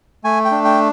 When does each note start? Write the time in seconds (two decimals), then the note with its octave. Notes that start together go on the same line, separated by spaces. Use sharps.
0.24 A3 G#5
0.45 G5
0.51 D4
0.65 G5